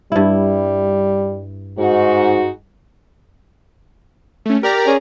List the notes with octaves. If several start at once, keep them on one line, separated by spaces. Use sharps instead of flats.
G2 G3 E4
G#2 G#3 D#4 F#4
A3 C#4
G4 A#4 D5 A#5
C#4 G#4